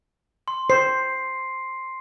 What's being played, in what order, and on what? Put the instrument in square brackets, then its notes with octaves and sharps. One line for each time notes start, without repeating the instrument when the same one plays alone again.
[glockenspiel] C6
[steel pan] C5 [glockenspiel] C7